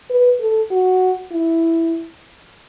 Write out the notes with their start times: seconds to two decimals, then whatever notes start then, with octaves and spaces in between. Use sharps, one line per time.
0.10 B4
0.40 A4
0.71 F#4
1.32 E4